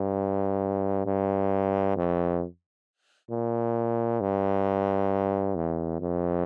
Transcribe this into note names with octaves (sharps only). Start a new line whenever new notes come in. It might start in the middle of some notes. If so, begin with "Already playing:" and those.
Already playing: G2
G2
F2
A#2
G2
E2
F2